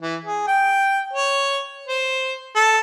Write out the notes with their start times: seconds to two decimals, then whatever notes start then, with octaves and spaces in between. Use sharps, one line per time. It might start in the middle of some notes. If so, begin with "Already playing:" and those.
0.01 E3
0.25 G#4
0.47 G5
1.13 C#5
1.88 C5
2.56 A4